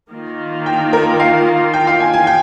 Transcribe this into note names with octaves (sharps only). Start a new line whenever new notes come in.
D#3 A#3 F4
G5
A#4
F5
G5
F5
G#5
G#5
G5